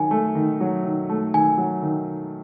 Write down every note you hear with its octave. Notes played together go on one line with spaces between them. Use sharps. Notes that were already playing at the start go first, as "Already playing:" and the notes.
Already playing: D#3 F#3 G#5
A3
D#3
F#3
D#3
A3
D#3 G#5
F#3
D#3